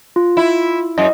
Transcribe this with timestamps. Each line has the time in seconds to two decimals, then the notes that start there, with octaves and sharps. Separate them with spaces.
0.16 F4
0.37 E4
0.98 F#2 D#5